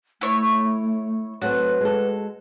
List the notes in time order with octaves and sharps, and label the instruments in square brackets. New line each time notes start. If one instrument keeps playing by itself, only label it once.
[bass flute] A3 [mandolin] E4 C#5 C#6
[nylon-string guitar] F#3 A3 C4 [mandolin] F#4 [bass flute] B4
[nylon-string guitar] G#3 A4